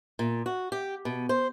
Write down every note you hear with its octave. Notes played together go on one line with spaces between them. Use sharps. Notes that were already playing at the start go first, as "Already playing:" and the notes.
A#2
F#4
G4
B2
C5